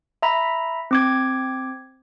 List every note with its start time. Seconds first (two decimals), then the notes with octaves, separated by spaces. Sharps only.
0.22 E5 A#5 B5
0.91 C4 D6 G#6